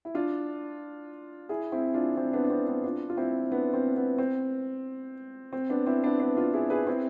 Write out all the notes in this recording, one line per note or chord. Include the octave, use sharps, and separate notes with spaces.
E4
D4 F4
E4 G#4
C4 E4
D4 F4
C4 E4
B3 D4
D4
C4
B3 D4
D4 F4
F4
C4 E4
B3 D4
C4
B3
C4
C4
B3 D4
C4 E4
B3 D4
B3 D4
D4 F4
E4 G#4
G#4 B4
C4 E4